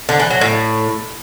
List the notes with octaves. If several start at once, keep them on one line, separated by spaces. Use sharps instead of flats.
D3
E3
F#3
A2